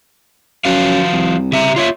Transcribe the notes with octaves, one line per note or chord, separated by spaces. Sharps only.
F#2 F3 F#4 F5
C2
C#3 E5 A#5
F4 C#5 E5